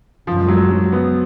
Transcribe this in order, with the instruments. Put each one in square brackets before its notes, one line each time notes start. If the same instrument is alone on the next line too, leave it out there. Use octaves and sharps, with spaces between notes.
[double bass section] F#2 C#3 G#3 [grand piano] F3
[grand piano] F#3
F#3
B3